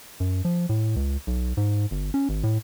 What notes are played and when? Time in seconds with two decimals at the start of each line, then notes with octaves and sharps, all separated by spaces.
0.20 F#2
0.45 F3
0.69 A2
0.96 C#2
1.27 B1
1.57 G#2
1.91 G1
2.14 C#4
2.29 G#1
2.44 A2